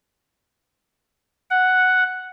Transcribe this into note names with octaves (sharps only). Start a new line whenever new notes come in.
F#5